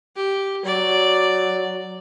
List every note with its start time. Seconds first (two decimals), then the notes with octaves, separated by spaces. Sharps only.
0.16 G4
0.65 F#3 D5